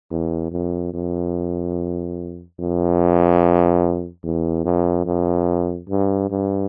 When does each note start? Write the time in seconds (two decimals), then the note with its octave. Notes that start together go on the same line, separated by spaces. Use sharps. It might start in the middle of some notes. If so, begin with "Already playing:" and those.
0.11 E2
0.52 F2
0.94 F2
2.59 F2
4.24 E2
4.65 F2
5.06 F2
5.89 G2
6.31 G2